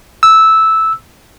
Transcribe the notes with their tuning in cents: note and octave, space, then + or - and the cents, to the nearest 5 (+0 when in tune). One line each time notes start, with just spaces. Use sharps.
E6 -10